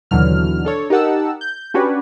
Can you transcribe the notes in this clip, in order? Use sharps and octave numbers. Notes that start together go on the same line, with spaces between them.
D#2 B2 D3 E3 F#3 F6
D4 A4 C#5
D#4 G4 A#4 F#5 A5 E6
G6
C#4 D4 F#4 G4 B4 C#5